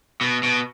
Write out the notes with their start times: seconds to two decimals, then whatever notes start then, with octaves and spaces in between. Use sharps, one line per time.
0.21 B2
0.43 B2